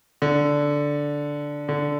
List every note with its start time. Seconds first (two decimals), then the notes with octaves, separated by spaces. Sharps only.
0.22 D3
1.69 D3